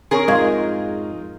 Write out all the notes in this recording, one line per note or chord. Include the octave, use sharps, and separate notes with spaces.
C4 G#4 A#4 C#5 C#6
F2 G#2 G#3 D#4 F4 F5 C#6 G#6